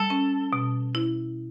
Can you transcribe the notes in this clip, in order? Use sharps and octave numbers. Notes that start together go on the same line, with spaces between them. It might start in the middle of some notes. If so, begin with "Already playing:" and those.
Already playing: G3 A4
C#4
B2
E4